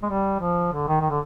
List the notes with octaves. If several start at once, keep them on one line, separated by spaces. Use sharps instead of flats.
G#3
G3
F3
D3
D#3
D#3
D3